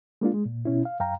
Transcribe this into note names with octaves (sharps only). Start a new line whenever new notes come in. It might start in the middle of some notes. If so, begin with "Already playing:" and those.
G#3 A#3 D4 F4
G#3
A#2
B2 C#4 E4
F5
F#2 F5 G5 A#5